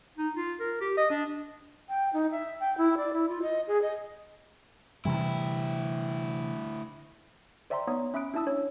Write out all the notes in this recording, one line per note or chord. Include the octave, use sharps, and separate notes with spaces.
D#4
F4
A#4
G4
D#5
D4
G5
D#4
E5
G5
E4
D5
E4
F4
D#5
G#4
D#5
D2 C3 E3 G3 E4
C5 D5 E5 G5 A#5 C6
B3 D#4 C#5 A#5 C#6 D#6
C#4 E5 B5 D#6 F#6 D7
D4 E4 E5 A5 D#6 E6
C#4 C#5